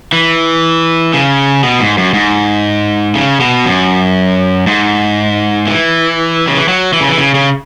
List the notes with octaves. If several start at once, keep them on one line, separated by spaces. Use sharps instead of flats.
E3
C#3
B2
G#2
F#2
G#2
C#3
B2
F#2
G#2
E3
C#3
E3
F#3
E3
C#3
E3
C#3
C#3